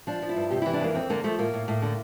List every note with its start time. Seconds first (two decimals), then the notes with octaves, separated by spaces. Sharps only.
0.07 F3 D4
0.22 F3
0.29 E4
0.36 G2
0.50 C3 G4
0.62 E3 E4
0.73 D4
0.80 F2 A#3
0.95 F2 C4
1.10 D3 A#3
1.24 F3 A3
1.39 A2 A#3
1.54 A2
1.68 A2
1.82 D3